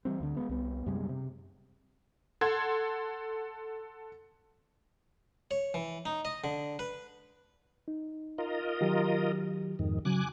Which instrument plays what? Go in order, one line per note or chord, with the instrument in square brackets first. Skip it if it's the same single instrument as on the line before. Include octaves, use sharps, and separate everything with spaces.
[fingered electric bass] E3 F3 G3 C4
D2 D3
G#3 B3
C2 B3
F#2 C3 G3 G#3
C3
[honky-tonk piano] A4 F#5 C6 G#6
[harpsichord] C#5
E3
D#4
D#5
D3
B4
[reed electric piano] D#4
[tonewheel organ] F4 A#4 D#5
[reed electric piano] D#3 F#3 G4
[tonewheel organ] F2 G#2 D#3
[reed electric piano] C#3 F#3 [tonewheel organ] G#5 D6 F#6